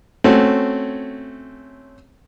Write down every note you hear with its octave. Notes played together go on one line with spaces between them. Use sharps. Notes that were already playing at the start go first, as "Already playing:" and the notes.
A3 C4 C#4 F#4